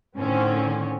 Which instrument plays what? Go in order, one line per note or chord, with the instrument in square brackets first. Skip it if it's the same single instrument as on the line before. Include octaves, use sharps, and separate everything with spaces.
[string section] A2 D3 D#3 C4 C#4